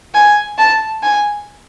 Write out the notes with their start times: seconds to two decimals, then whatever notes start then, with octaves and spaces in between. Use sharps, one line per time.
0.15 G#5
0.58 A5
1.03 G#5